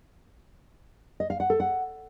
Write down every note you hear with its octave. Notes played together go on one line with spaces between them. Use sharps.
D#5
F5
F#5
A4
F#5